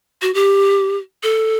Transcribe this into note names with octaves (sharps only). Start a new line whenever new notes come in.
F#4
G4
A4